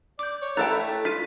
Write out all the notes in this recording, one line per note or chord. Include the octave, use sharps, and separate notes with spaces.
D5 D6 G6
C#5
A3 E4 A4 G5 A#5 F#6 A6
F4 B6 D#7